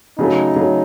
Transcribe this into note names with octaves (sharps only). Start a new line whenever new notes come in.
C#3 F#3 A3 D#4
C#3 F#3 A3